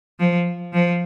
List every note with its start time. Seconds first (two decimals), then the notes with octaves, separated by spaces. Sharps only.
0.19 F3
0.73 F3